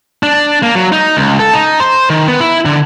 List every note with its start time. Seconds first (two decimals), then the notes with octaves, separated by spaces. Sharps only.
0.23 D4
0.63 A#3
0.75 F#3
0.92 D#4
1.17 C#2
1.39 A4
1.54 D#4
1.80 C5
2.10 D#3
2.28 B3
2.40 E4
2.65 D3